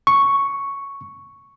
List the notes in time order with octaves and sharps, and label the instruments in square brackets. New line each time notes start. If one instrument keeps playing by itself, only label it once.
[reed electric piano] C#6